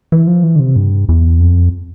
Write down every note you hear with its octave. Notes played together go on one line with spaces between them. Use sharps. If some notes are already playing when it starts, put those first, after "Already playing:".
E3
F3
E3
D3
C3
G2
E2
F2